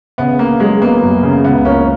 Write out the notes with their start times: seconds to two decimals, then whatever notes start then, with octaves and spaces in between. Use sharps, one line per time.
0.18 C#3 B3
0.39 A#3 B3
0.60 F#3 G#3
0.81 A#3 B3
1.03 F#2
1.23 C#3
1.44 C#2 B3
1.65 A#3 C#4